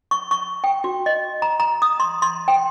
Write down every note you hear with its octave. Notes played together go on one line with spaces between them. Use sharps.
C#6
C#6
G5
F#4
D#5
A#5
A#5
D#6
C6
C6
G5